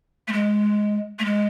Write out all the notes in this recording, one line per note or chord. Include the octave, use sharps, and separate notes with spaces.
A3
G#3
A3
G#3